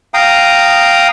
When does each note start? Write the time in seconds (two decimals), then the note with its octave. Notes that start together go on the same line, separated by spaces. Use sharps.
0.14 F5 G5 A#5 D#6